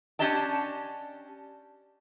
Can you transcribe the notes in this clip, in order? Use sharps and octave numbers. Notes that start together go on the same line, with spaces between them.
C#4 D4 G4 D5 D#5 A5